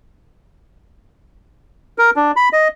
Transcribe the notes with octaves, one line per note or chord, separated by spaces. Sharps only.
A#4
D4
B5
D#5